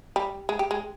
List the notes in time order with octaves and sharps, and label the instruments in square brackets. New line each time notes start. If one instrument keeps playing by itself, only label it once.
[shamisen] G3
G#3
G4
G#3